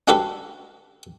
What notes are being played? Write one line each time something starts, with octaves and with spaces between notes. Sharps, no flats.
C#4 D4 F#4 G4 A4 B4